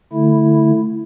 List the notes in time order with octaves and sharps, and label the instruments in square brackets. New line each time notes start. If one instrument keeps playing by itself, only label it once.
[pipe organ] D3 A3 E4